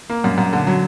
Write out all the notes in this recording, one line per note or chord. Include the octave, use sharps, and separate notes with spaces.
A#3
F#2
F#2
D3
F#3